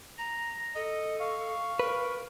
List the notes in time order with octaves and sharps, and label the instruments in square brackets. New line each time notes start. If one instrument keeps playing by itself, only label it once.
[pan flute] A#5 [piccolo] A#6
[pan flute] A4 [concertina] D#5
[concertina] F5 [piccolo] C#6
[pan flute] A#4 [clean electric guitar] B4